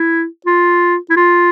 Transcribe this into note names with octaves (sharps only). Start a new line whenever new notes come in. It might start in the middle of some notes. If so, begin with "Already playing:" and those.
Already playing: E4
F4
E4
F4